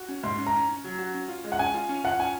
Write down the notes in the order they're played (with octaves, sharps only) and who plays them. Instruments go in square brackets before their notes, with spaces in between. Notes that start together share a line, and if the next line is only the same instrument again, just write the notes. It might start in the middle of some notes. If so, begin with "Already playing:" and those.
Already playing: [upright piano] F#4
C#4
[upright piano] G#2 [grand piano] C6
[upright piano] C#4
[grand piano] A#5
[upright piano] C#4
C#4
F#3
F#4
C#4
F4
G#3
[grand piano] F#5
[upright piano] C#4 [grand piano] G#5
[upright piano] F4
C#4
[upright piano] F4 [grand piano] F#5
[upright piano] C#4 [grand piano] G#5